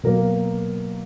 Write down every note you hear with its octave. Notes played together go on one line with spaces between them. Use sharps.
B2 F#3 A#3 A#4